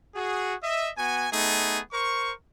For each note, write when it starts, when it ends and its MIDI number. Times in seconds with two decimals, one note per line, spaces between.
0.15 0.54 66
0.15 0.54 68
0.63 0.89 75
0.63 0.89 76
0.98 1.28 59
0.98 1.28 66
0.98 1.28 80
1.33 1.80 57
1.33 1.80 59
1.33 1.80 63
1.33 1.80 68
1.93 2.31 70
1.93 2.31 72
1.93 2.31 85